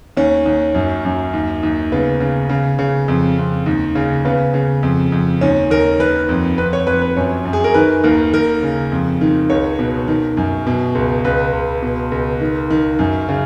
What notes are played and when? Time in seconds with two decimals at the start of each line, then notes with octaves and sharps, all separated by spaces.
0.17 D#2 C#4
0.46 D#2
0.75 F#2
1.05 F#2
1.33 D#2
1.63 D#2
1.92 C#3 B3
2.20 C#3
2.49 C#3
2.79 C#3
3.08 F2
3.38 F2
3.66 D#2
3.95 C#3
4.25 C#3 B3
4.54 C#3
4.83 F2
5.12 F2
5.41 D#2 C#4
5.70 D#2 A#4
6.00 D#3 B4
6.29 F2
6.58 F2 B4
6.73 C#5
6.87 F2 B4
7.02 B4
7.16 F#2 C#5
7.45 F#2
7.53 G#4
7.64 A#4
7.74 D#3 B4
8.04 D#2 A#4
8.33 D#2 A#4
8.63 C#3
8.92 F2
9.21 D#3
9.50 C#2 C#5
9.79 B2
10.08 D#3
10.37 F#2
10.67 B2
10.95 C#2
11.25 C#2 B4
11.53 C#2
11.82 B2
12.12 C#2
12.41 D#3
12.70 D#3
12.99 F#2
13.29 C#3